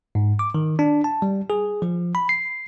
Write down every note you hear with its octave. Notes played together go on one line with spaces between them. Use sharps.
G#2
D6
D#3
D4
A5
G3
G#4
F3
B5
C7